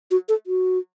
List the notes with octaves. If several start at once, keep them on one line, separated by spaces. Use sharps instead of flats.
F#4
A4
F#4